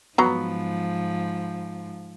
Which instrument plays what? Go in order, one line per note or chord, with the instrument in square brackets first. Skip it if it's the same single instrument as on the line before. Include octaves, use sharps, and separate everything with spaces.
[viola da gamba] G#2 F3 [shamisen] F#3 A#5 [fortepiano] B3